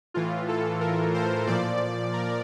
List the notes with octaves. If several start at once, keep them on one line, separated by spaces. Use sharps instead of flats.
A2 E3 F4
A4
A#4
C5
A#2 F3 D5
A#4